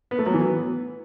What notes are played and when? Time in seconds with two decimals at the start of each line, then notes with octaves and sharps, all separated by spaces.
0.11 B3
0.19 A3
0.26 F#3
0.34 E3
0.41 B3